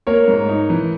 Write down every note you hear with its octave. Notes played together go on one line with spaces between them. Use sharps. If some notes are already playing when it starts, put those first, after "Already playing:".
A#3 A#4 C#5
G#2
D#4
E3